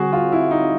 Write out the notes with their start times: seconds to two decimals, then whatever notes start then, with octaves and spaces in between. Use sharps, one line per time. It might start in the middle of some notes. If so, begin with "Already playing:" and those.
Already playing: D3 G3 C4 F#4 G#4
0.13 F4
0.32 E4
0.51 D#4